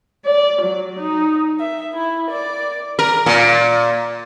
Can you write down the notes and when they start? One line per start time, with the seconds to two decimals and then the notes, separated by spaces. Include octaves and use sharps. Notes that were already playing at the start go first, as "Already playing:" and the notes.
0.25 D5
0.62 F#3
0.99 D#4
1.59 E5
1.95 E4
2.29 D5
2.99 A#4
3.26 A#2